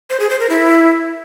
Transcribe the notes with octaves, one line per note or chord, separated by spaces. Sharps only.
C5
G#4
C5
A#4
E4